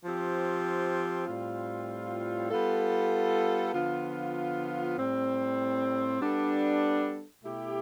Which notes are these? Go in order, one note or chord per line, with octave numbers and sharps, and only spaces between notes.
F3 C4 G4
A2 G3 C4 F4
G3 B3 F4 A4
D3 F3 B3 F4
A2 G3 C4
G3 B3 D4 A4
B2 A3 E4 G4